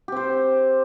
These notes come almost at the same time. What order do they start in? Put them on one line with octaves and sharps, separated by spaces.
G4 C4 C5